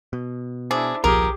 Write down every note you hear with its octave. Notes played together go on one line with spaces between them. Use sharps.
B2
D4 E4 G#4 C5 D6
D#1 B1 F3 G4 G#4 A#4